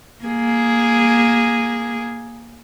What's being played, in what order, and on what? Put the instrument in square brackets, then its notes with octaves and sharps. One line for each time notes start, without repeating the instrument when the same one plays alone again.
[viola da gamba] A#3 G#4